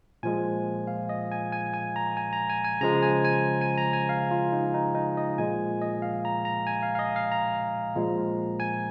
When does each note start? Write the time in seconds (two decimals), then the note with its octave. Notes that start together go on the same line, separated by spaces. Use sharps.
0.23 A#2 F3 G#3 G#5
0.87 F5
1.09 D#5
1.32 G#5
1.53 G#5
1.74 G#5
1.96 A#5
2.17 G#5
2.33 A#5
2.49 G#5
2.65 G#5
2.81 C#3 F3 G#3 A#5
3.02 G#5
3.25 G#5
3.61 G#5
3.78 A#5
3.93 G#5
4.09 F5
4.31 F4
4.52 D#4
4.74 D#4
4.95 D#4
5.17 D#5
5.38 A#2 F3 G#3 G#5
5.81 D#5
6.02 F5
6.25 A#5
6.45 A#5
6.67 G#5
6.83 F5
6.95 F5
6.99 D#5
7.16 F5
7.32 A#5
7.96 A#2 F3 G#3
8.60 G#5